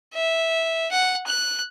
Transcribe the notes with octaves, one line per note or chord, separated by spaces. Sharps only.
E5
F#5
F#6